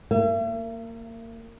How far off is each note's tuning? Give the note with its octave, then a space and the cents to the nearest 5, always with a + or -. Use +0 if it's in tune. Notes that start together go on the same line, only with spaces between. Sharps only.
A#3 -25 E5 +45